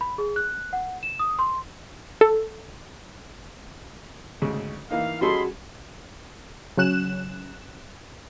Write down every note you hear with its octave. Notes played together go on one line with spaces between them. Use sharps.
B5
G#4
F#6
F#5
E7
D#6
C6
A4
D2 G#2 C#3
E3 A#3 D#4 F5
G3 C#4 F#4 G#4 A4 D#5 B5 C6
C#3 F#3 C#4 F#6 E7